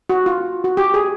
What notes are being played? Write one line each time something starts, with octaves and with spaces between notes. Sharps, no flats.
F#4
F4
F#4
G4
G#4